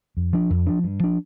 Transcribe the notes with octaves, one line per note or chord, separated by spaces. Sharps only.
F2
F3 D4
F2
F3 D4
G2
F3 D4